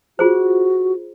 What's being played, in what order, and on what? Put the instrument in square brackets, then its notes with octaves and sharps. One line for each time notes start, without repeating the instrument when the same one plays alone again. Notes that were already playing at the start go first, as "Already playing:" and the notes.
[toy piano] F4 G#4 C5 [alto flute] F#4